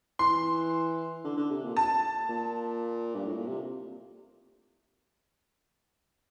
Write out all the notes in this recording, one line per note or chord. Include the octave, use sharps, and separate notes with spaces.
E3 C6
D3
D3
C3
A#2
A5
A#2
G2
A2
A#2
C3